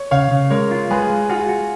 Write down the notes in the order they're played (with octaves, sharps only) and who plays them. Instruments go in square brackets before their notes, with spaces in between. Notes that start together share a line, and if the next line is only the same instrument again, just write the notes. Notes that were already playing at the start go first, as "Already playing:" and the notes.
Already playing: [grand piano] C#5
[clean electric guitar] C#3 [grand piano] C#5 F5
[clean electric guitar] C#3
[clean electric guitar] G#3 [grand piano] A#4 C#5
[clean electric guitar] F4
[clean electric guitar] G#3 [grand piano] G#4 B4
[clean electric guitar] G#3
[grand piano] F4 G#4 [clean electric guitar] F#4
[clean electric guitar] F#4